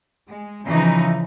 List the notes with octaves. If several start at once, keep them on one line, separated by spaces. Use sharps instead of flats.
G#3
C#3 E3 F3 D#4